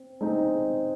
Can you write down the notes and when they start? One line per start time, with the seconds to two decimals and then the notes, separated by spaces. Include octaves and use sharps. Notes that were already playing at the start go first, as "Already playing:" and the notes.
Already playing: C4
0.21 G#3 C4 D#4